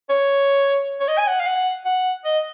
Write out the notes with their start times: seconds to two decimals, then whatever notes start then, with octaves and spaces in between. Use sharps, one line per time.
0.09 C#5
1.00 C#5
1.08 D#5
1.18 G#5
1.27 F#5
1.40 F5
1.46 F#5
1.85 F#5
2.25 D#5